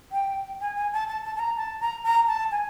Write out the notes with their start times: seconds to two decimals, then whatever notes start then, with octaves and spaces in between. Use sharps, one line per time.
0.12 G5
0.61 G#5
0.76 G#5
0.93 A5
1.08 A5
1.24 A5
1.36 A5
1.39 A#5
1.57 A5
1.80 A#5
2.04 A#5
2.27 A5
2.51 G#5